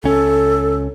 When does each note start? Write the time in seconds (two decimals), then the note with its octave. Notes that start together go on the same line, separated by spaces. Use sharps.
0.04 C#2 C#4 A4